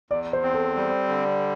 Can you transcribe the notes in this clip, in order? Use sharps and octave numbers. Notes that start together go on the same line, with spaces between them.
E2 D5
C5
C4
A4
G3
D3